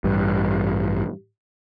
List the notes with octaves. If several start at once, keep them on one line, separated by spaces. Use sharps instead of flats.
A1 G2